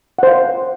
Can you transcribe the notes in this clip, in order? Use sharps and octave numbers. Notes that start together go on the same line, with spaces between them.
C5 F5 F#5